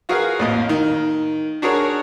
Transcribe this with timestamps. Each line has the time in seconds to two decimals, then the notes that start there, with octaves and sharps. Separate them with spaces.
0.09 F4 F#4 G#4 A#4 B4 F5
0.39 A1 F2 A#2 D#5
0.69 D#3
1.62 D4 F#4 G#4 A#4 C#5